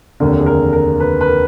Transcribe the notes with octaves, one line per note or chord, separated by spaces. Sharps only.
F1 D#2 D3 A#4
G#4
A#4
A#4
B4
B4
A#4